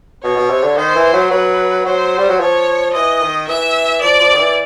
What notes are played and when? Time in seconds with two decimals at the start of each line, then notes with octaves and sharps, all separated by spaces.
0.24 B2 C#5
0.36 B2
0.50 C3
0.63 D3
0.77 D#3 C5
0.96 E3
1.13 F#3
1.31 F#3 B4
1.86 F#3 C5
2.18 G3
2.30 F#3
2.40 F3 C#5
2.94 E3 D#5
3.21 D#3
3.48 E3 E5
4.02 F3 D5
4.20 F3
4.33 D#3
4.39 E3